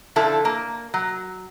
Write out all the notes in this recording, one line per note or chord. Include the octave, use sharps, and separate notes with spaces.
D3 F3 E4 A4
A#3
F#3